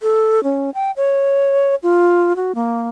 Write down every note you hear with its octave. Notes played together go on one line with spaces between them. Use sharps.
A4
C#4
G5
C#5
F4
F#4
A#3